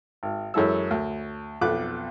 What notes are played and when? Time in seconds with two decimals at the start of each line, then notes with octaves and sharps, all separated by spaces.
0.23 G#1
0.54 F#2 E3 G#3 A4 E6
0.91 D2
1.61 B1 F2 B3 A4 D6 F#6